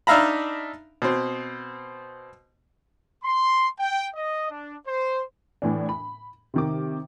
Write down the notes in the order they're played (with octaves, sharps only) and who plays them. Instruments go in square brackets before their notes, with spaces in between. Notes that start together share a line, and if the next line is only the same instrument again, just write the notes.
[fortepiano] D4 D#4 E5 F5 A#5 B5
B2 C4
[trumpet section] C6
G5
D#5
D4
C5
[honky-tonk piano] A2 E3 D4
B5
C3 D#3 D6